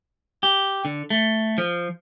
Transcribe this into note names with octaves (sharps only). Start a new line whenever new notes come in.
G4
D3
A3
F3